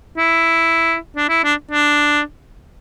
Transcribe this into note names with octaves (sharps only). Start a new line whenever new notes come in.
E4
D4
E4
D4
D4